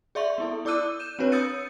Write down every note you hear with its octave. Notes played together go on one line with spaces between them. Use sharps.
G#4 D5 E5 C6 C#6
B3 E4 A4
E4 D5 D6 E6 F#6 D#7
G6 D#7 E7
C4 D4 F#4 B4 C#5
D#6 E6 G6 A6 C#7 D#7